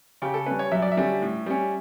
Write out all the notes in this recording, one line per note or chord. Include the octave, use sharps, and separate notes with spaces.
C#3 G4
A4
G3 C#4 B4
C#5
F#2 E5
D5
E5
D3 G3 C#4
A2
G3 C#4